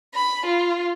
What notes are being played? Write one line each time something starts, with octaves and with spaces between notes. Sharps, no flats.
B5
F4